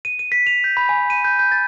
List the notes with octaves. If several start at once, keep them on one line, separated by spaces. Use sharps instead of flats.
D#7
D#7
B6
F7
G6
B5
G#5
D#7
G6
G6
A6